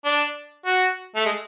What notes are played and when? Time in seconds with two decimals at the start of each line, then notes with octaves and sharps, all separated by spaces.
0.05 D4
0.66 F#4
1.15 A3
1.26 G#3